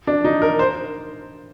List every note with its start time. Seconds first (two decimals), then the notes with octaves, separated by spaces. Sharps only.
0.07 D4
0.25 D#4
0.42 A#4
0.59 C5